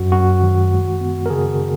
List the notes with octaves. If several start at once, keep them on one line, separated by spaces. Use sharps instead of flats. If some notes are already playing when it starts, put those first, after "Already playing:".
Already playing: F#2 F#3 F#4
F#2 F#4
D#3
G#3
B3
A#4
C#3 G#4